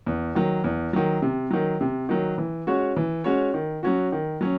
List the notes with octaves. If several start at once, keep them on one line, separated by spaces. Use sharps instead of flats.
E2
D#3 F#3
E2
D#3 F#3
C3
D#3 F#3
C3
D#3 F#3
E3
G#3 C#4 F#4 C#5
E3
G#3 C#4 F#4 C#5
D#3
F#3 C#4 F#4
D#3
F#3 C#4